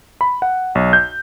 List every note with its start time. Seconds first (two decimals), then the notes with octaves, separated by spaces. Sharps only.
0.21 B5
0.42 F#5
0.75 B1
0.93 G6